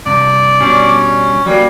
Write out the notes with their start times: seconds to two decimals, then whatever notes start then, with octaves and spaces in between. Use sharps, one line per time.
0.06 G2 C3 D5
0.60 B2 G3 C#4 D4
1.46 F#3 G3 A#3